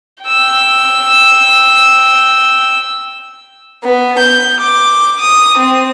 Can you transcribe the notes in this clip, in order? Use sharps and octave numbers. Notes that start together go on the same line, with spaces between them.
G5 E6
B3
G6
D6
D#6
C4